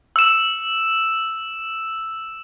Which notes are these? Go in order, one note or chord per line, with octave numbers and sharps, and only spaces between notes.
E6 E7